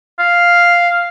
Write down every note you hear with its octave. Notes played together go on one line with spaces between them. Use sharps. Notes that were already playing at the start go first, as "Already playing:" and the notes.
F5